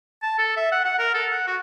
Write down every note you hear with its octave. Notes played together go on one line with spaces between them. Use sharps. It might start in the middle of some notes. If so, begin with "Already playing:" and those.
A5
A4
E5
F#5
F#5
A#4
A4
F#5
F#4